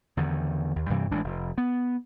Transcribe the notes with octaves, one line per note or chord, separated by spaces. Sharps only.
E2 D3 D#3
D#2
G2 C3 E3 G3
A1 E3 G#3 D4
F1
B3